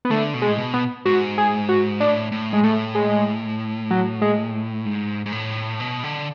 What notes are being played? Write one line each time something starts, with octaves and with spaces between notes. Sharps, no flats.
B3
D3 A3
B2
G#3
A2
B2
B3
G#2 F#4
G#4
F#4
A2 D4
A2
G#3
A2 A3
G#3
F#3
G#3
G#2
G#2
A2
B2
D3